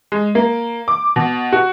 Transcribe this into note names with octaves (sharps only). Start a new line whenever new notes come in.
G#3
A#3
D6
B2
F#4